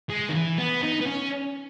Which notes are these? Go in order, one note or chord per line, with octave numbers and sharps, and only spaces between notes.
G#3
D#3
E3
B3
D#4
B3
C#4